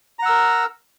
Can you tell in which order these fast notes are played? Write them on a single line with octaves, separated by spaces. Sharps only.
A#5 F#5 E6 A#4